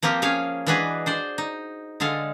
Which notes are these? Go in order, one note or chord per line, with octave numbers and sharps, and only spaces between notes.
F3 A#3 C4 F4 G4
C#4 G#4 C#5 F5 G#5
E3 G#3 D4 F#4 G#4 B4
D4 C5 D5
D#4
D3 G#3 A4 F5